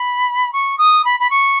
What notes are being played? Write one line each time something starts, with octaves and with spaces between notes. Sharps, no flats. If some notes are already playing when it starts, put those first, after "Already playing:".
Already playing: B5
C#6
D#6
B5
B5
C#6